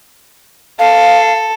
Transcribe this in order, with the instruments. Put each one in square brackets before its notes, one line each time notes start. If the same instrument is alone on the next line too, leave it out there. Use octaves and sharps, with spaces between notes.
[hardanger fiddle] A4 [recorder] F5